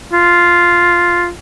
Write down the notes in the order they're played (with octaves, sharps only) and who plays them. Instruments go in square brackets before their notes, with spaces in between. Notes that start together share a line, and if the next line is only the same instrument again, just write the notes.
[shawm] F4